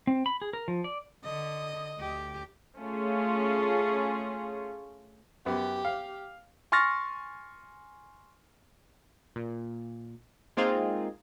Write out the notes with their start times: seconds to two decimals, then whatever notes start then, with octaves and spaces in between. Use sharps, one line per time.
0.07 C4
0.26 B5
0.42 G#4
0.53 A#4
0.68 F3
0.84 D5
1.24 D3 D#5
1.98 D2 G4
2.77 A3 C#4 F4 G#4
5.46 F#2 B3 G4
5.85 F5
6.72 G#5 C6 C#6 F6 A6 A#6
9.36 A#2
10.57 G#3 A#3 C4 D#4 F4 G#4